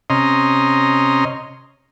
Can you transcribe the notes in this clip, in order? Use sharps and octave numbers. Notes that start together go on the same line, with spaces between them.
C3 C#4 D#5 A#5 C6